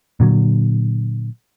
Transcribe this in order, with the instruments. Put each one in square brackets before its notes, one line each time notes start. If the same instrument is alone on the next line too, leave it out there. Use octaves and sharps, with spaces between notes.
[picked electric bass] A#2 D3 F#3